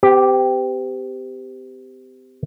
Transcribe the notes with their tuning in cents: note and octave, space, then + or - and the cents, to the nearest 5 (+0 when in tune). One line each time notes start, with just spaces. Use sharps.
C4 -45 G4 +0